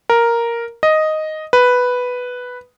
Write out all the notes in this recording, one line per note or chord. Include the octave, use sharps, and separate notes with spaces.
A#4
D#5
B4